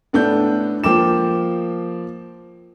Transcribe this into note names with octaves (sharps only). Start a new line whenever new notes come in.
A2 B3 D4 A4 G6
F3 A#3 G5 D6 E7